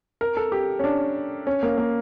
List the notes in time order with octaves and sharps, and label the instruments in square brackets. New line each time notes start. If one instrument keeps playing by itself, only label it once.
[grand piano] A#4
A4
G4
C#4
D4
C#4
A#3
A#3